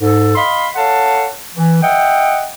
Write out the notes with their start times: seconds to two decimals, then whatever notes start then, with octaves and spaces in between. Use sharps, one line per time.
0.01 G#2 A4
0.36 D#5 F5 B5 C6
0.75 A4 C#5 F5 F#5 A5
1.55 E3
1.82 D#5 E5 F#5 G5